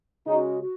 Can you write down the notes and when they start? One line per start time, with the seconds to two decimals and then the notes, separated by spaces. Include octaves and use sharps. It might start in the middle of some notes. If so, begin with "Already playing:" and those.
0.26 C#3 G#3 C#4 D#4 F#4
0.61 F#4